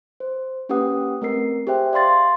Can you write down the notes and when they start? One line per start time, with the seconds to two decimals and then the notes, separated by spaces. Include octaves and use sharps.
0.20 C5
0.69 A#3 C#4 G4 B4 F#5 D#6
1.22 A3 C4 A#4 C7
1.67 G4 G#4 C5 E5 G5
1.93 D5 F5 C6 A6